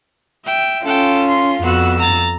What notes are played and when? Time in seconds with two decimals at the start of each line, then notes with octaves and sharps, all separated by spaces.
0.45 E5 G5
0.85 C#4 F4 A4 G5
1.29 C6
1.62 F2 B3 F#4 E6
1.99 A#5 A6